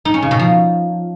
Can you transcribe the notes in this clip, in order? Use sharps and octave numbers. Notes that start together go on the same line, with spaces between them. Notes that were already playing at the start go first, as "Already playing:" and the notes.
D#4
C#4
C#3
B2
F3